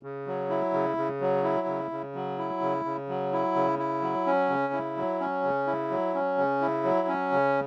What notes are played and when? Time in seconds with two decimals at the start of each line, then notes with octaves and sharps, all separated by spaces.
0.03 C#3
0.27 F#3
0.50 E4
0.73 C#3
0.97 C#3
1.21 F#3
1.44 E4
1.67 C#3
1.91 C#3
2.15 F#3
2.38 E4
2.61 C#3
2.85 C#3
3.09 F#3
3.32 E4
3.55 C#3
3.79 E4
4.02 F#3
4.26 C#4
4.49 C#3
4.73 E4
4.97 F#3
5.20 C#4
5.44 C#3
5.67 E4
5.91 F#3
6.14 C#4
6.38 C#3
6.61 E4
6.85 F#3
7.08 C#4
7.32 C#3